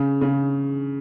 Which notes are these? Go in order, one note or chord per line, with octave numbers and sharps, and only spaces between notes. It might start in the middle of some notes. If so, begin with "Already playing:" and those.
Already playing: C#3
C#3